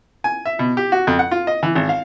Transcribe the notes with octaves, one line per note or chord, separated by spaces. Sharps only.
G#5
E5
B2
G4
F#4
F2
F#5
F4
D#5
E3
G#1
F5